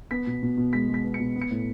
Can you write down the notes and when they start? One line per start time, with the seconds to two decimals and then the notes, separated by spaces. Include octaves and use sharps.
0.11 B3 B6
0.27 B2
0.43 B2
0.57 B2
0.73 G#3 B6
0.89 G#3
0.94 B6
1.04 B3
1.14 C#7
1.20 B2
1.36 B3
1.42 C#7
1.51 A2